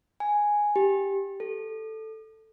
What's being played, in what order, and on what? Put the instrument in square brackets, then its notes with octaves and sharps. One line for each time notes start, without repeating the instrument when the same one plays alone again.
[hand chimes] G#5
G4
A4